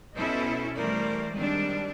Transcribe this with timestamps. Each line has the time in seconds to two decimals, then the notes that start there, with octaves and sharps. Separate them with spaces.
0.18 B2 C#4 E4 A4 C5 D#5
0.76 E3 G3 A3 A#4 C5 D5
1.35 D#3 G3 G#3 C4 D4